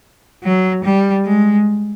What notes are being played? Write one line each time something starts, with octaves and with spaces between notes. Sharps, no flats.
F#3
G3
G#3